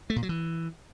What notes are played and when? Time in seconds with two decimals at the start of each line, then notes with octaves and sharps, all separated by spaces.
0.10 A3
0.16 A#2
0.23 F#3
0.29 E3